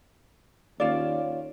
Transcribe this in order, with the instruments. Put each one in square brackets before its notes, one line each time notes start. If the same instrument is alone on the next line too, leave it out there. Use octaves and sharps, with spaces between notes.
[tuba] D#2 [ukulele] C#4 F4 D5